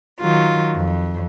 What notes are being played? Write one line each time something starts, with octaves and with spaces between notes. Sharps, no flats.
D#3 F#3 F4
F2